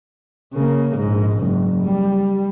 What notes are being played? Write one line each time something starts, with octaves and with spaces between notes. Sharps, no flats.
C#3 A#3
A#1 G#2
F#1 G#2
G3